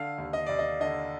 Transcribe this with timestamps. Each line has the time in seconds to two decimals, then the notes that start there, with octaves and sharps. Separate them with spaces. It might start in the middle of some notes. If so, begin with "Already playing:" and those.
Already playing: D3 F5
0.18 D#2
0.33 D#5
0.47 D#2 D5
0.59 D#5
0.80 D3 D#5